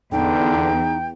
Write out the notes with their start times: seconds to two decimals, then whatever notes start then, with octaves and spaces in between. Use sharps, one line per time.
0.12 E2 D3 D#4 G5